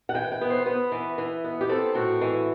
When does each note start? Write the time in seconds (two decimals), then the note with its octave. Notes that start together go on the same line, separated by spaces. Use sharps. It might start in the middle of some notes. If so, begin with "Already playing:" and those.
0.09 F#5
0.14 E3 G5
0.32 G5
0.41 B3
0.50 C5
0.66 B3 B4
0.92 E3
1.18 E3
1.44 B3
1.61 G4
1.69 C4 A4
1.95 A2 F#4
2.21 E3